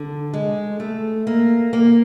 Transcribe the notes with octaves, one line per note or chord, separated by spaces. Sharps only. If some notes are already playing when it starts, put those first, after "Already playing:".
Already playing: D3
G#3
A3
A#3
A#3